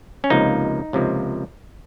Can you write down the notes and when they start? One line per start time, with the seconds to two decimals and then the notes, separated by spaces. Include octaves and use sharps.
0.24 C#4
0.30 C#2 C3 F3 A#3 D#4
0.93 C#2 C3 F3 A#3